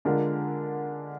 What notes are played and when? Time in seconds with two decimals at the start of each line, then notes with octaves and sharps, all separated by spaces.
0.05 D3 G#3 D4 F4 A#4